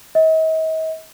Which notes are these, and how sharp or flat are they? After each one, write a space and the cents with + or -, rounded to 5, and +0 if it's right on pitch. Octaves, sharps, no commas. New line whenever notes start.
D#5 +45